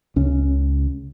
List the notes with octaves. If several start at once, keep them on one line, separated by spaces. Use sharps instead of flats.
C#2 C#3 C#4